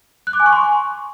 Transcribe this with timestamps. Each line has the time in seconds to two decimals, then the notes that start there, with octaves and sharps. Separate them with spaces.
0.27 F#6
0.33 D6
0.40 G#5
0.46 C#6
0.52 C6